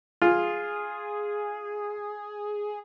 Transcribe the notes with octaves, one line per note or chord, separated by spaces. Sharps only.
F4 G#4